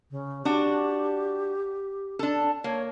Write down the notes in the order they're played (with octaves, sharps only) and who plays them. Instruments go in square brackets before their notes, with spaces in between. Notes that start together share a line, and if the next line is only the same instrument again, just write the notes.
[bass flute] C#3
[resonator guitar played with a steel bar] D4 F#4 [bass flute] G4
[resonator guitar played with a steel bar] D4 A4
[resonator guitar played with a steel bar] A#3 [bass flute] C#5